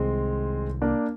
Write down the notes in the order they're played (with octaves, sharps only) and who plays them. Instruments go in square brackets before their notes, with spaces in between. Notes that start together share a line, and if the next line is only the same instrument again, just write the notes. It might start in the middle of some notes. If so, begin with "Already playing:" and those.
Already playing: [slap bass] C2 C3 D#3 [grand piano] G#3 C4
[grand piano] A#3 D4